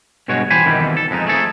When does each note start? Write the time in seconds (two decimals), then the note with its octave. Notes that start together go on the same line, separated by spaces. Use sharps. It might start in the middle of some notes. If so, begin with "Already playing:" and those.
0.28 G2 B2 G#3 F#4 C#5
0.50 E3 G4 C5 G#5 B5
0.66 F2 B2 D#3 E3 G3
0.97 A4
1.11 F2 G#3 C#4 D#4
1.27 A3 G#4 A4